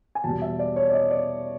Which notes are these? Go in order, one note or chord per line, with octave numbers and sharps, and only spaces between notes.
G#5
E2 B2 G3 A5
E5
D5
C#5
D5
D#5
D5